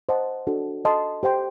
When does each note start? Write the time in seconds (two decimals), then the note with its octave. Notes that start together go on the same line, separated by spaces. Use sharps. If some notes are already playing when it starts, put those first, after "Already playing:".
0.09 C5 D#5 F#5 A5
0.47 D4 F#4 A4
0.85 A4 D#5 A5 C6
1.23 G4 C5 G5 C6